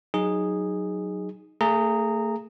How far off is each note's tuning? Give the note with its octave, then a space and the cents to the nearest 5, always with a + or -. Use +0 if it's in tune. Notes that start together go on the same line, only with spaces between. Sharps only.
F#3 +0 D#4 +0 G#4 -10
A3 +35 G#4 +0 A#5 -20